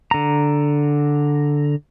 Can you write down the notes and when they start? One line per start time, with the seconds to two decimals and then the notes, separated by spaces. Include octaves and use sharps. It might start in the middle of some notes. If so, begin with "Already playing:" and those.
0.11 D3 A#5